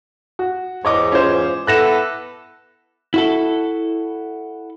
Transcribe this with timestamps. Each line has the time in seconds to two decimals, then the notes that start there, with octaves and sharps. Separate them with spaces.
0.39 F#4
0.85 E2 G#2 C#5 D#5 D6
1.12 C#4 F4 C5
1.67 B3 E4 A4 F#6 A#6 E7
3.14 E4 F#4 A4